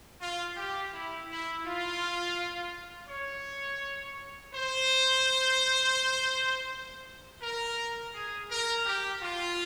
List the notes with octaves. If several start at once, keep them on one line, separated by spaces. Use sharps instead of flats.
F4
G4
E4
E4
F4
C#5
C5
A#4
G#4
A#4
G4
F4